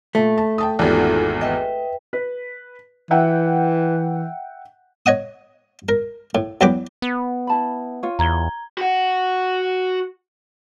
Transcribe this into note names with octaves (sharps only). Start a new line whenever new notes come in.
A#2 A3
A5
G5 A5 D#6
G#1 E2 B3 D#4 F4 G4 A4 D5
B4 D#5 E5 G5
B4
E3 E5 F#5 G5
C#5 D#5 F#5 D#6
A#4
A2
E2 F#3 G4 B4 D6
B3
E4 A5 B5
F4 C#5
E2 A#5 G#6 G7
F#4 F#5